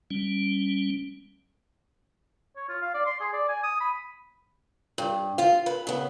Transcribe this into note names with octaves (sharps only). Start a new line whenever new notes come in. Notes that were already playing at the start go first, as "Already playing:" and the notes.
G3 C#4
C#5
F4
F5
D5
C6
G#4
D5
G#5
D#6
B5
G2
F4 F5
B4
C#3 B3